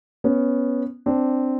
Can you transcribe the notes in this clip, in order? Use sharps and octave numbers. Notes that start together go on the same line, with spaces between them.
B3 C#4
C4 D4